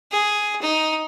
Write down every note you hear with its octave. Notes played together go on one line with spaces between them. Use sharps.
G#4
D#4